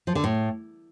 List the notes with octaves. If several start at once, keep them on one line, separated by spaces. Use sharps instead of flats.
F3
D3
A2